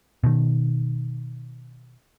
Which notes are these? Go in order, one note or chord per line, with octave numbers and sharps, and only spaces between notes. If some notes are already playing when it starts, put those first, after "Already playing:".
B2 D#3